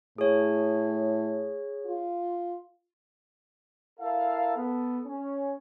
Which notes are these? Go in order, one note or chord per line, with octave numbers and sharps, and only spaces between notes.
A2 G#4 C#5
F4
E4 A4 A#4 F5
B3 A4
C#4